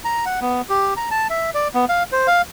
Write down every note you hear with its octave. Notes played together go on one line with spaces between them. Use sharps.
A#5
F#5
B3
G4
A#5
A5
E5
D5
B3
F5
C5
F5